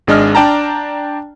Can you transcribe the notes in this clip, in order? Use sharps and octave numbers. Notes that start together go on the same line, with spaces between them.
G#1 G#3 D4 D#5 F6
D4 D5 G5 A5 A#5